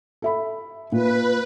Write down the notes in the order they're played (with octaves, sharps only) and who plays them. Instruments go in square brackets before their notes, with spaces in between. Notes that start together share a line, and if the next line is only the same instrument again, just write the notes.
[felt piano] A4 E5 B5
[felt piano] A#2 [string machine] B4